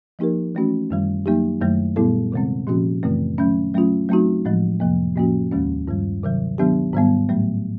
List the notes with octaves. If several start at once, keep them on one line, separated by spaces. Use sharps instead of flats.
F3 A#3 D#4 G4 A#4
E3 A3 C#4 F#4
F#2 D#3 G3
F#3 A#3 D#4 G4
F#2 D#3 F#3 A3
A#2 G3 B3 E4 A4
C3 D#3 G#3 C4
A#2 F3 A#3 C#4 F#4
F#2 C#3 E3 A3 C4
D#3 F#3 A3 C#4
F#3 A3 C#4 F4
F#3 A3 C4 D#4 F#4
A2 F3 G#3
F2 C3 F3 A#3
A2 F3 A#3 C#4 F#4
D#2 D#3 G#3 C#4
G2 D#3 G3
C3 D#3 F#3
D#3 F#3 B3 D4 G4
G#2 D#3 G3 B3
A2 F#3 A3